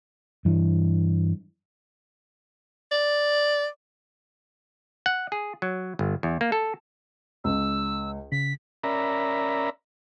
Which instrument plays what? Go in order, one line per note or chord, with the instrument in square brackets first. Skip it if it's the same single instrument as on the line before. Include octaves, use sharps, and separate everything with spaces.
[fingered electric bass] G2 E3
[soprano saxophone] D5
[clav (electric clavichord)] F#5
G#4
F#3
G1
E2
A#3
A4
[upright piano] C#2 [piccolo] E6
[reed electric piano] C#3 [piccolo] B6
[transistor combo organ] C#4 A#4 D5 E5 A#5 B5